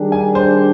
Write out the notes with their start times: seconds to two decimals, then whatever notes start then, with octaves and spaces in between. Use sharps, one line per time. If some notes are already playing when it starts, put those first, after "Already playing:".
Already playing: D#3 G3 D4 G#4
0.12 G#5
0.35 C5